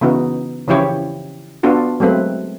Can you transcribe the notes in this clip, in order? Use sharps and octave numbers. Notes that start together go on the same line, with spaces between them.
C#3 E3 B3 D#4 F#4
C#3 E3 F3 E4 G4 C#5
B3 D4 F4 F#4 A4
F#3 G#3 A3 C4 B4